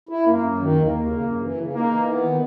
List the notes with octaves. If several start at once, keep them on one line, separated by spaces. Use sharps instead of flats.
E4
F#2 A#3
F#2
D#3
D#2 A#3
D#2
C#3
F#2
E3
C#3
A#3 D#4
E3
B3
D#3